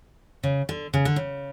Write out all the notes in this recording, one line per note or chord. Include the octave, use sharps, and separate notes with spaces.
C#3
D3
C#3
D3
C#3